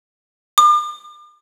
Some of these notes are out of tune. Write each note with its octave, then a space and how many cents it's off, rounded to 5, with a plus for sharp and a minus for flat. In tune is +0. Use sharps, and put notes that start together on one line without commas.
D6 +40